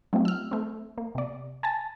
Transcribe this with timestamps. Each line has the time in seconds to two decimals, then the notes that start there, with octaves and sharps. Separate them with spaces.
0.13 F#3 A3 C4 D#4 F4 G4
0.25 E6 F6
0.51 A3 C4
0.98 A#3
1.15 C3 D5
1.63 G#5 A5 A6